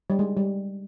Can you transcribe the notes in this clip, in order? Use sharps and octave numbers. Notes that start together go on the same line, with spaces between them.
G3
G#3
G3